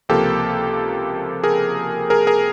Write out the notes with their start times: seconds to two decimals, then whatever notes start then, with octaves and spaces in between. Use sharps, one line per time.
0.09 C#2 C3 F3 A#3 G4 A4
1.44 G#4 A#4
2.10 G#4 A#4
2.27 G#4 A#4